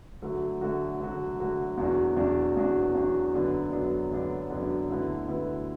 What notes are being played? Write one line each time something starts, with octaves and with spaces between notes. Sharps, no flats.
D3 F#3 A3 F#4
D3 F#3 A3 F#4
D3 F#3 A3 F#4
D3 F#3 A3 F#4
E2 B2 F#3 D4 F#4
E2 B2 F#3 D4 F#4
E2 B2 F#3 D4 F#4
E2 B2 F#3 D4 F#4
F#2 D3 F#3 B3 D4
F#2 D3 F#3 B3 D4
F#2 D3 F#3 B3 D4
F#2 D3 F#3 B3 D4
D2 D3 B3 E4 B4
D2 D3 B3 E4 B4